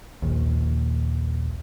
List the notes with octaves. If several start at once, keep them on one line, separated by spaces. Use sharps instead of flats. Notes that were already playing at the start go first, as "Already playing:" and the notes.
A#1 D#2